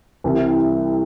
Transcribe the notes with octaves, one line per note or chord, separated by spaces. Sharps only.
C2 C3 E3 G3